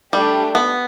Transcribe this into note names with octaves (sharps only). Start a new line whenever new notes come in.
G3 A3 D4 G4
B3